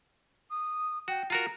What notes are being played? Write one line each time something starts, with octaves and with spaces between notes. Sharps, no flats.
D#6
F#4 G5
F4 F#4 A#4 A#5